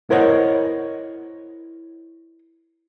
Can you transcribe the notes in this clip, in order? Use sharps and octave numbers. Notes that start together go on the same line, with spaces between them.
E4 A#4 C5 C#5 D#5 F#5